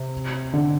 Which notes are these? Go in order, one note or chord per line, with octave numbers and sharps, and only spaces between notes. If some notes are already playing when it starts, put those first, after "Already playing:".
Already playing: C3
D3